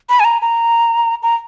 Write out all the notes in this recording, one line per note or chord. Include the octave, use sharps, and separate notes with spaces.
B5
G#5
A#5
A#5
A#5